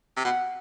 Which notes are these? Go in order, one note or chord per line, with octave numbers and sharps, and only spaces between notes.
C3
B2 F#5